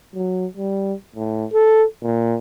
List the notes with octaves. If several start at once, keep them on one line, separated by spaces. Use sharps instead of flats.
F#3
G3
A2
A4
A#2